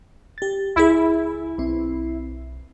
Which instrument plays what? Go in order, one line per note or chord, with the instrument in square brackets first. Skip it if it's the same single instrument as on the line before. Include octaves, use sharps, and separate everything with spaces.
[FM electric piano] G4 A6
[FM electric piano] C#2 G#4 [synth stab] E4
[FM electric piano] B1 C4